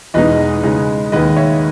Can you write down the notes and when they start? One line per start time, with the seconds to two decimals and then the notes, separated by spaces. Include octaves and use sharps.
0.14 E2 B2 G#3 D#4 B4 D#5
0.63 C#3 G#3 D#4
1.12 D#2 D#3 G#3 B4 D#5
1.36 C#5 E5